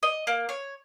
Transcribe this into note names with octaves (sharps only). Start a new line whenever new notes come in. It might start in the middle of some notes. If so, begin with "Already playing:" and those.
D#5
A#3
C#5